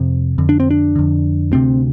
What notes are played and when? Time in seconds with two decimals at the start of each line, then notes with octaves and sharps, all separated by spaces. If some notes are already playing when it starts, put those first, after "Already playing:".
Already playing: F2 C3 C4
0.38 F2 D3
0.49 D4
0.60 C4
0.71 D4
0.96 F2 D3
1.52 D2 C3 C4